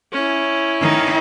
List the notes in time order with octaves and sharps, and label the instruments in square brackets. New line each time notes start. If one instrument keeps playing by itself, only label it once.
[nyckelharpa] C#4 E4
[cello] D#3 D#4